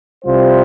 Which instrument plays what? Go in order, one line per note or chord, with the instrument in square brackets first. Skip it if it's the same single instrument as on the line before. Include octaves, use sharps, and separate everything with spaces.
[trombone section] C2 C3 G3 F4 C5